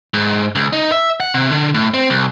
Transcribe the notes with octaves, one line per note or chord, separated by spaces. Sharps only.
G#2
C#2
D#4
E5
F#5
C3
D3
A2
C4
C2